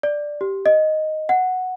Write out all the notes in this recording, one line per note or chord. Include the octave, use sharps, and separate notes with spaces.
D5
G4
D#5
F#5